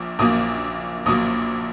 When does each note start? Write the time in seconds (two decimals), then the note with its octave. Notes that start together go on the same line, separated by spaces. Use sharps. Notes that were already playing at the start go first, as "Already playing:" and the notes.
Already playing: A#1 A#2
0.19 A#1 A#2 F#3 A#3 D#6
1.06 A#1 A#2 F#3 A#3 D#6